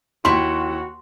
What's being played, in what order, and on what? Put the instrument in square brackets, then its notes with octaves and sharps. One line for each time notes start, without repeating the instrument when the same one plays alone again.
[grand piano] D#2 [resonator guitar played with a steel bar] E4 G5 [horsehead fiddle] F#4 [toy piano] C6